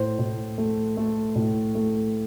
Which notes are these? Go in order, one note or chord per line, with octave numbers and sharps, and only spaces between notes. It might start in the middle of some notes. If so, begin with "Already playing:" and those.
Already playing: A2 C5
A2
A3
A3
A2
A3